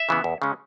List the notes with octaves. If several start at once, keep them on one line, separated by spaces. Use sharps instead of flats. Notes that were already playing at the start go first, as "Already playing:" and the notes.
Already playing: E5
C#3 E3 B3
E2
C#3 G#3 C#4